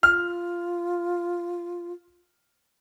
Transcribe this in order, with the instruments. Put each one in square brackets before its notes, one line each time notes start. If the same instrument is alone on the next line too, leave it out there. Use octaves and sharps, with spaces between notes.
[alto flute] F4 [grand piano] F6